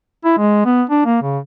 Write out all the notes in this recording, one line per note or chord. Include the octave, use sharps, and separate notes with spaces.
E4
G#3
B3
D4
A#3
C#3